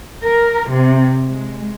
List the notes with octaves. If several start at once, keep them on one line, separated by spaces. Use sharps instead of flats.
A#4
C3
G#3